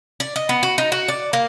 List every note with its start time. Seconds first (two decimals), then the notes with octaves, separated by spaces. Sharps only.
0.20 D5
0.36 D#5
0.49 B3
0.63 F#4
0.78 D#4
0.92 F#4
1.08 D5
1.33 A#3